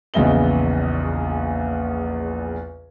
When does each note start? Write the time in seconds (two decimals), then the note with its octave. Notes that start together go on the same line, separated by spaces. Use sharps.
0.14 A#1 E2 C#3 D#5 E5 G7